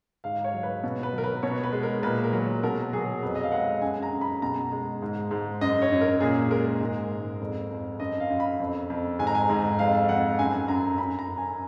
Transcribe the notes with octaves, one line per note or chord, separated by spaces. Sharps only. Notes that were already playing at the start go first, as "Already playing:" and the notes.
G#2 F5
C#5
F#3
B4
B2
B4
F#3 A#4
B4
B2 C#5
B4
G#3
A#4
A#2 B4
A#4
F#3
B2 A#4
F#3 G#4
F2 B4
D#5
F5
G#3 F#5
F#2 G#5
A#5
F#2
B5
B2 A#5
G#3
G#2
G#2
F#2 D#5
C#5
F#2
A#4
A#2 G#4
G#3 A#4
G#2
G#2
F2
F2
F#2 D#5
F5
F#2
B5
F2
F2
G#2 G#5
A#5
G#5
G#2
F2 F5
F2 F#5
F#2 G#5
F#2 A#5
F#2 B5
A#5
F#2
G#5